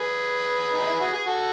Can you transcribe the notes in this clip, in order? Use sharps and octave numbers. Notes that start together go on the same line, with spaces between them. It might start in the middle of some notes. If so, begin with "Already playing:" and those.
Already playing: G#4 B4
D#4
E4
F#4
G#4
F#4 A4